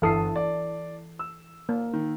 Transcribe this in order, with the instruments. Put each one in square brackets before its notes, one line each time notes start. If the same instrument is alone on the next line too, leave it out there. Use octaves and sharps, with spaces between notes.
[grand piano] G1 D#6 C7 [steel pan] E3 A4
[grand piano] D5
E6
[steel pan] A#3
[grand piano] D#3